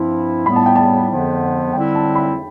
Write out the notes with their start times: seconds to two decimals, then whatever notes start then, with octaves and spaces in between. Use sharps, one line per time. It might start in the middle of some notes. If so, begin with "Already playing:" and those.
Already playing: G2 F3 C4 E4
0.46 A2 G3 B3 B5
0.56 A5
0.66 G5
0.76 A5
1.09 F2 D3 F3 B3
1.73 D3 G3 C4 E4 G5
1.95 A5
2.15 B5